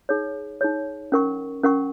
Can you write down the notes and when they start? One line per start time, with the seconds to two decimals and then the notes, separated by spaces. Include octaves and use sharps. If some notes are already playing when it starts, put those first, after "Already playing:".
0.09 D#4 G#4 C#5
0.61 D#4 G#4 C#5
1.12 C#4 A#4 F#5 C#6
1.63 C#4 A#4 F#5 C#6